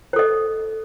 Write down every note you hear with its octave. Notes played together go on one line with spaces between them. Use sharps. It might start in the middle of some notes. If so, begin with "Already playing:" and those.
A4 C5 D#5